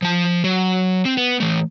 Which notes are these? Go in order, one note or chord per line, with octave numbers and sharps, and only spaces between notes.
F3 A5
F#3
C4
B3
E3 A3